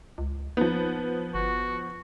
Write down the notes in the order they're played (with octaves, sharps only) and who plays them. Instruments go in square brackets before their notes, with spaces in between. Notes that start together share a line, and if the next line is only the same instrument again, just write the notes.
[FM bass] C#2
[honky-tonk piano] F3 B3 [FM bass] D#4
[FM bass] G1 [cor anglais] F#4